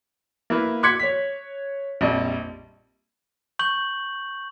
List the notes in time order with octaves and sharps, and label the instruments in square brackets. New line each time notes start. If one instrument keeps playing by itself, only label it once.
[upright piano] A#3 E4 B4
C6 D6 F#6 G#6 B6 C#7
C#5 B6
A#1 F2 G3 D#5
[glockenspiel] C#6 G6 F#7